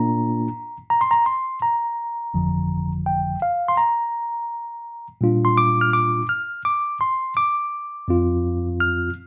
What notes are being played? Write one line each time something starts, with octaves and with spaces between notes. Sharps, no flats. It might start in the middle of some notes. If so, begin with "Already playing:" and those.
Already playing: A#2 A#3 D4 F4 A#5
A#5
C6
A#5
C6
A#5
G1 F2 D3 F3
G5
F5
C6
A#5
A#2 G3 D4 F4
C6
D6
F6
D6
F6
D6
C6
D6
F2 F3 C4 F4
F6